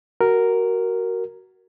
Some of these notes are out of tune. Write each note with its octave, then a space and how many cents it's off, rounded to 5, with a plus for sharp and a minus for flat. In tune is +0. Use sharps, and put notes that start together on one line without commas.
F#4 +15 A#4 +0